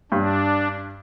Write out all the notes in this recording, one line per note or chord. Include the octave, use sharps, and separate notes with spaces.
G2 D4